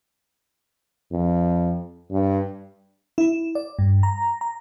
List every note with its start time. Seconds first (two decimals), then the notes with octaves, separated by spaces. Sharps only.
1.12 F2
2.11 G2
3.18 E4
3.55 D5
3.79 G2
4.03 A#5
4.41 A#5